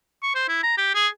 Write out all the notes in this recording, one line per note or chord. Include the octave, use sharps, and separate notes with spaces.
C#6
C5
E4
A#5
G4
G#4